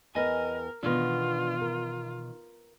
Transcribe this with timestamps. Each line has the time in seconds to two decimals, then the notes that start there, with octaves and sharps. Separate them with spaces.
0.15 E2 A#4 B4 D#5 G5 G#5
0.83 B2 D#3 E3 B3 D4 F4
1.61 A#4